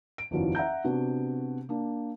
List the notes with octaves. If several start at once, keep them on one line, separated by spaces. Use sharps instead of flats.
D7
F#1 E2 D#3 F3 F#3 F4
E5 F#5 A#5 G6
C3 B3 D4 F#4
A#3 D4